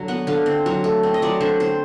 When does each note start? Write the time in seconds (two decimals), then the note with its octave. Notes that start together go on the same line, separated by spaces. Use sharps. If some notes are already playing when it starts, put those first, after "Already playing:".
Already playing: D3 F#3
0.08 B3 F#5
0.27 D3 F5
0.46 C4
0.66 F#3
0.84 A3
1.03 C4
1.14 D#5
1.22 F#3 D5
1.41 D3 C5
1.60 C4 C5